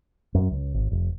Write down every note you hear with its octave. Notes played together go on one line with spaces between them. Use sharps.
F#2
C#2
G#1
F1